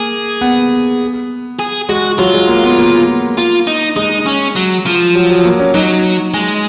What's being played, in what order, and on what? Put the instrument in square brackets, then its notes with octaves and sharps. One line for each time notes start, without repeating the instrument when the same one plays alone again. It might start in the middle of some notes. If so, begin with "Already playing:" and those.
Already playing: [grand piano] A#3 [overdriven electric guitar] G#4
[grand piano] B3
[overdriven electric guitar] G#4
[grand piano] G#3 [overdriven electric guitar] F#4
[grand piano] F#3 [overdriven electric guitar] F4
[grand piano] G#3
A#3
B3
A#3
[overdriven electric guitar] F4
D#4
[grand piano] G#3 [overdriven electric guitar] D#4
[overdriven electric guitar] C#4
F#3
F3
[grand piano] F#3
F#3
A#3
C#4
[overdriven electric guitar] F#3 [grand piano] D#4
[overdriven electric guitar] G#3